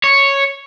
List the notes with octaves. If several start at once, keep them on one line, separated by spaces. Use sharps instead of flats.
C#5